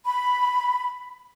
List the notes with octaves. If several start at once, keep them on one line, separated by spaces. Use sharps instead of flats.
B5